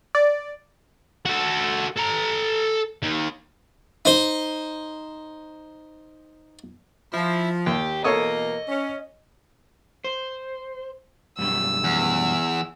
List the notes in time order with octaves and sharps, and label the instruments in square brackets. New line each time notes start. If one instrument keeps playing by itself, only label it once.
[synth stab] D5
[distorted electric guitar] F#4 A4
A4 A#5
D#2 D#3
[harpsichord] D#4 C5
[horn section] F3 [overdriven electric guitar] E4
[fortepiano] D#2 [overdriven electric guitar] G4
[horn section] B2 E3 A#3 [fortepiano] A4 C#5 D#6 [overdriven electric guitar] D#5
[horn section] C#4
[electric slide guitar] C5
[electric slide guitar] F#2 B2 G3 [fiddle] E6
[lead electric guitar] E2